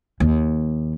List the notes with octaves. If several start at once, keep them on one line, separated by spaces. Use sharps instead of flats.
D#2